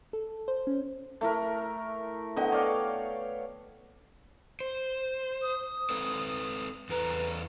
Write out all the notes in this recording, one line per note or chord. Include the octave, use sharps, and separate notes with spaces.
A4
C5
C#4
A3 E4 A#4
D3 B3 D#5 G5
C#5 D5 F5
C5
D#6
C4 A4 B4
E2 A4 B4 A#5